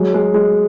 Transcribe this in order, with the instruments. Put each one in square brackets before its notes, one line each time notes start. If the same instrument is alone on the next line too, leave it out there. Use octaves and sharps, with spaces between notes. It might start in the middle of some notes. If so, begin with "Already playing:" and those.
Already playing: [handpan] F#3 [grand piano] G#3
[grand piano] G#3
G#3